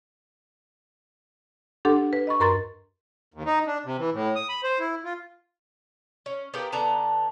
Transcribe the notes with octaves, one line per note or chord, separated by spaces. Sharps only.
D4 G4 A4 F#5 C6
D4
B4
D#5 B5 C#6
F#2 A#4 A#5 C6 A6
D#2
D#4
D4
C3
E3
A2
D#6
B5
C5
E4
F4
C#4
B3 F4 G4 A#4
D3 B3 A5 A#5